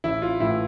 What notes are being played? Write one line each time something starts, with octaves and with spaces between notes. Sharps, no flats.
A1 E4
F4
A2 E3 E4